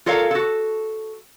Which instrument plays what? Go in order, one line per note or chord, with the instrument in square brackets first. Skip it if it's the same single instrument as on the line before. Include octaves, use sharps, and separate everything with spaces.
[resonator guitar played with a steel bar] F4 A4 A#4 C#5 F5
F#4 A4